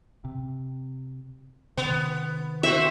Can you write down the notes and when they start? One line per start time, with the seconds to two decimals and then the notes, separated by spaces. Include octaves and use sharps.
0.25 C3
1.77 C3 D#3 B3
2.63 C4 F#4 E5